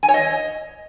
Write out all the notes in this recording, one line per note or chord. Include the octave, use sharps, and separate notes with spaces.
G#5
C#5
D#5